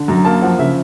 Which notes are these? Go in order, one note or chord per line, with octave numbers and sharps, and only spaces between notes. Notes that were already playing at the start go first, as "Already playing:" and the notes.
Already playing: D3
F#2 A#5
A#3 A5
F3 F#5
C#3 E5